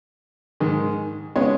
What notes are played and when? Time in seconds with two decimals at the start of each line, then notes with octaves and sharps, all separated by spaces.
0.60 G#2 D#3 G#3
1.36 C#3 G#3 B3 C#5